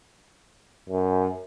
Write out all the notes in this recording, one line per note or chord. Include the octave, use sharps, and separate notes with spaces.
F#2